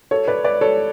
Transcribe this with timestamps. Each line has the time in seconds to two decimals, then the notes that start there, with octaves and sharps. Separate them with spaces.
0.11 A4 C#5
0.28 B4 D5
0.44 B4 D5
0.61 A4 C#5